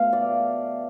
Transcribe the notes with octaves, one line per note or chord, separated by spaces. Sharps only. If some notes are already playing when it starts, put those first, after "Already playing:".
Already playing: B2 A3 F5
D5